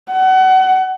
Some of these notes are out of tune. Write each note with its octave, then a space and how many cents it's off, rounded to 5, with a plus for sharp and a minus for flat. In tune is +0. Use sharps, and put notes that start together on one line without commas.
F#5 +30